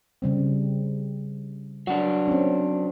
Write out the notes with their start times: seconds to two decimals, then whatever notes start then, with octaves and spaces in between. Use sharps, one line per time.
0.22 C#3 G3 C4
1.87 F#3 D4 F#5
2.28 C4 C#4